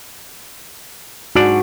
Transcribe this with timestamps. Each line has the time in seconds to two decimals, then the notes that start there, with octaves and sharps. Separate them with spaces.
1.36 G#2 D4 F#4 D5